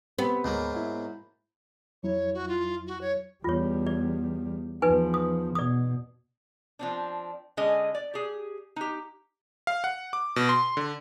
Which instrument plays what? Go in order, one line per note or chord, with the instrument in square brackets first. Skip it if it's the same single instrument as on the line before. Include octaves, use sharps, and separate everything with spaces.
[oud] B3 [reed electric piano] C4 G4
[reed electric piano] D2 [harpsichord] G#2 F#3 A#3
[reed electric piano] E4
[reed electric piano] F2 F#3 E4 [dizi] C#5
[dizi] F#4
F4
F#4
C#5
[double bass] E2 G3 [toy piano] F4 C#5
[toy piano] D5
[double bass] E2 F3 [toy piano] D#4 B4 G#5
[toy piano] D#6
[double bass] B2 [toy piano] D5 D#6
[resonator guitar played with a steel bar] F3 C4 D4
D3 G#3 C#4 G#4 D#5 G#5
D5
G4 G#4
D#4 G4
[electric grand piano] F5
F#5
D6
B2
C6
D3